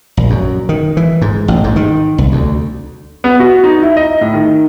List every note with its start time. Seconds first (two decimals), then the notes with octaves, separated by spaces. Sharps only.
0.17 A#1
0.30 F#2
0.69 D#3
0.97 E3
1.22 G#2
1.48 A1
1.64 G#2
1.76 D#3
2.18 C2
2.32 D2
3.24 B3
3.40 F#4
3.64 D#4
3.82 E4
3.97 D#5
4.21 A2
4.34 D#3